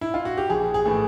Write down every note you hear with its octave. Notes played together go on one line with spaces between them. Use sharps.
E4
F4
F#4
G4
A#1 G#4
G#4
A2 E3 A3